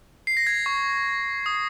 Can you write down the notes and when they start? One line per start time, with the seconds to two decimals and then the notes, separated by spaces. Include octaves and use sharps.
0.27 C7
0.37 A#6
0.47 G#6
0.66 C#6
1.46 D#6